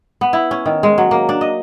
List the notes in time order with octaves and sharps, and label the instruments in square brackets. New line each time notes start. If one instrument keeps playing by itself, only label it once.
[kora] B3
E4
C#4
D#3
G#3
F#3
A#3
D4
D#5